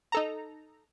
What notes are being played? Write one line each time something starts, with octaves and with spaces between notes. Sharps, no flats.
D#4 A4 A#5